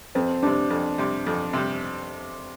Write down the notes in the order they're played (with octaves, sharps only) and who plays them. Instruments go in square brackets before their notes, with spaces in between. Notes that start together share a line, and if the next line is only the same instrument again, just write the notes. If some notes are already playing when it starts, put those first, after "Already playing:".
[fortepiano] F2 [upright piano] C4
[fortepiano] C3 G3 [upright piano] D4
[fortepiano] F2
C3 G3
F2
C3 G3